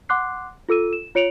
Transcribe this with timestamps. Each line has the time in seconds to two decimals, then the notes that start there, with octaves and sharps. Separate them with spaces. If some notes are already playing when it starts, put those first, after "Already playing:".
0.09 F#5 C6 D6 F#6 C7
0.69 F4 A4 E6 D#7
0.93 E7
1.15 F4 C#5 C#7 D7 F7 F#7